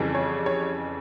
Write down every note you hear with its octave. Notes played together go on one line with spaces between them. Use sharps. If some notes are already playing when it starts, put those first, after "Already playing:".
Already playing: F2 C#3 E3 G3
C#5
C#5